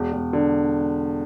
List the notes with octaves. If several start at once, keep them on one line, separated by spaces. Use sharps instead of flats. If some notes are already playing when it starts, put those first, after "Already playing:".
Already playing: E1
E1
D3